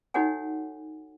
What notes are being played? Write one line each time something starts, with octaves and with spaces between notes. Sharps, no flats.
D#4 F#4 A4 C#5 F#5 G#5